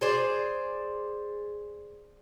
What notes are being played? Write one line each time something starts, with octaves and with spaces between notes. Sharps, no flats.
G#4 C5 D5